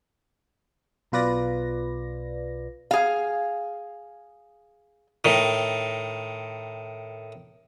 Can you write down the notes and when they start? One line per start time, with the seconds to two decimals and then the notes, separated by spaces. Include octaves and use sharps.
1.12 B1 B2 F4 B4 D5 A#6
2.91 G#4 F5
5.25 A2 D#3